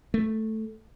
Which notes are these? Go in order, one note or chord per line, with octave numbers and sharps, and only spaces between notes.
A3